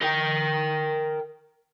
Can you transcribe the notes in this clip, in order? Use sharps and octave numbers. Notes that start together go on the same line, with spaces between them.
A#4 G5